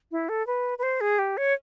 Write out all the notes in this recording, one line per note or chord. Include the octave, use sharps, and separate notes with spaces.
E4
A4
B4
B4
C5
G#4
G4
C#5